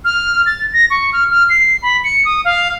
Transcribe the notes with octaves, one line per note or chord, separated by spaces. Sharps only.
F6
A6
A#6
C#6
F6
F6
C7
B5
C#7
D#6
F5